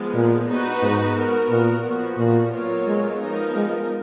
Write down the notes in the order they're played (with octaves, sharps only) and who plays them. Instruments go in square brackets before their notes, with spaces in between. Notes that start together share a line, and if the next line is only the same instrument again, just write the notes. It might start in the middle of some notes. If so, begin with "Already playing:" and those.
Already playing: [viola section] F3 G#3 B3
[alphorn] A#2
[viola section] B3 D#4 F#4 B4
[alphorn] G#2
[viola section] B3 F#4 A#4
[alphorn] A#2
[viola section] F3 B3 F#4
[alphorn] A#2
[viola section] F#3 B3 F4 A#4 C#5
[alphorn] G#3
[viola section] F3 B3 D#4 A#4
[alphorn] G#3